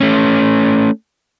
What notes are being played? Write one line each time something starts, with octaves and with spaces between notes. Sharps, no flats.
A3 C#4